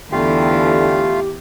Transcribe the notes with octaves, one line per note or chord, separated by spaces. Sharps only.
E2 D3 E3 A3 F4 G4 F5